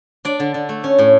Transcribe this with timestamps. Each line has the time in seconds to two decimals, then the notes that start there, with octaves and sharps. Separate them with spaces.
0.25 D4 D5
0.40 D3
0.54 D3
0.69 A3
0.84 C#4
0.99 A2